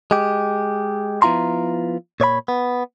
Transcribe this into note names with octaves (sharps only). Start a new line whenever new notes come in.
G#3 G4
F3 B3 E4 F4 A#5 C6
A#2 C#5 D5 B5
B3